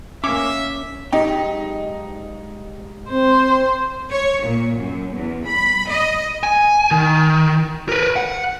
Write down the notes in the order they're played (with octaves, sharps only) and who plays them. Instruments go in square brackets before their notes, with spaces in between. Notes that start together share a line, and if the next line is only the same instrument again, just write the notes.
[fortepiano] A#3 D6 [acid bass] C#4 [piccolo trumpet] E5
[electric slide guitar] G#2 G4 G5 [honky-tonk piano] D#4
[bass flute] C4 [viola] C5
[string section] C#5
A#2
F#2
E2
B5
D#5
[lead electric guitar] G#5
D#3
A#4 B4
F#5